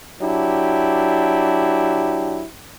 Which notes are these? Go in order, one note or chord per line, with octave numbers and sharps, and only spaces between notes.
F#3 D4 E4 G4